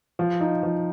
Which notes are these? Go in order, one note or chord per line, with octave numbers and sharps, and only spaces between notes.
F3
D#4
F3